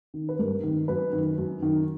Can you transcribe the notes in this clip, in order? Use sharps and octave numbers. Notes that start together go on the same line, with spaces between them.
D#3
B4
G2 A#4
D#3
F#2 B4
D#3
F#2
D#3